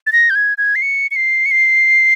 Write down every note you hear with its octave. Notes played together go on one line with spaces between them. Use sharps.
A6
A#6
G6
G#6
G#6
C7
C#7
C#7
C7
C#7
C7